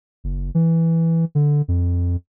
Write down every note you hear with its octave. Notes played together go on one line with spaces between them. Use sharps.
F#1
E3
D3
F2